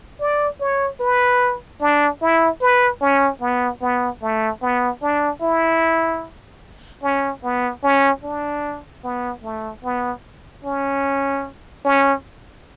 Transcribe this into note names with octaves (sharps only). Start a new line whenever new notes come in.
D5
C#5
B4
D4
E4
B4
C#4
B3
B3
A3
B3
D4
E4
C#4
B3
C#4
D4
B3
A3
B3
C#4
C#4